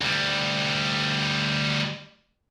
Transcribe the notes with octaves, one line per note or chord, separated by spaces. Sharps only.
D2 G3